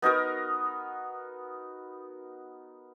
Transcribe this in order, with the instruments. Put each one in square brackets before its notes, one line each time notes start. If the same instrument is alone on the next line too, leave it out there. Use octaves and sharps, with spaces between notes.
[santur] B3 D#4 F#4 A#4